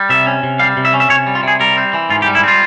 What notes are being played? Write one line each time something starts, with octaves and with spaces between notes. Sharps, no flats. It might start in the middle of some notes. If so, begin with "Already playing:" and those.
Already playing: G3
C3 E5
C#4
C3
G3 F5
C3
E5
C#4
E5
C3 C#5
G3
F4
C3 G#4
G3 A#4
C4
E3
G#2 F4
G4
G3
E4
C4 F4